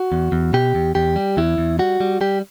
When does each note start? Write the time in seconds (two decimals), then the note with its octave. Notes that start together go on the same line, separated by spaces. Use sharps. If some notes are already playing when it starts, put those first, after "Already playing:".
Already playing: F#4
0.12 E2
0.32 E2
0.54 B2 G4
0.75 E2
0.95 E2 G4
1.16 G3
1.37 E2 E4
1.58 E2
1.79 G3 F#4
2.00 G3
2.21 G3 G4